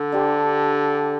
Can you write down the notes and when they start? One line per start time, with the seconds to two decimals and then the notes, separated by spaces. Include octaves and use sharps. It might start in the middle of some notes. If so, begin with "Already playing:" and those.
Already playing: D3
0.12 D4 G4 C5